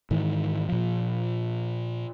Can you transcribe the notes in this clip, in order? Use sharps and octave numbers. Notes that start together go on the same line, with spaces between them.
G#2 D#3 E3
A#2 F3